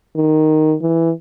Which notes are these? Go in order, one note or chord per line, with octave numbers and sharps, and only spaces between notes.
D#3
E3